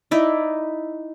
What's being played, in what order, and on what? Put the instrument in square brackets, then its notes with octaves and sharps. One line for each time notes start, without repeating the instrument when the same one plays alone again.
[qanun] D#4 E4 D5